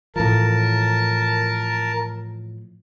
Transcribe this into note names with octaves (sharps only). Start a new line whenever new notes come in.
A2 E3 F3 A#4 A5